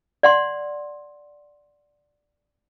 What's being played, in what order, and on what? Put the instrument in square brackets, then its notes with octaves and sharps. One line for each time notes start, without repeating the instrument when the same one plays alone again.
[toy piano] D5 F#5 C6